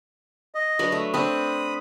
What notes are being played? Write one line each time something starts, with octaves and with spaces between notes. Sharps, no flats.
D#5
F#3 D4 B4
A3
C4 D4 B5 D#6